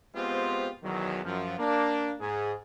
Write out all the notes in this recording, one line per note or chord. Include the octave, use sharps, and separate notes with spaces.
G#3 B3 C4 F4 G4 C5
B1 E2 D#3 F#3
F#2 F3
A#3 D4
G#2 G#4